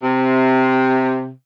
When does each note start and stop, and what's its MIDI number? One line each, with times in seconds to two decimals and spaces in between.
0.03 1.30 48